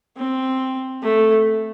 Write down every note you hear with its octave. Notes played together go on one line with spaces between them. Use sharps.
C4
A3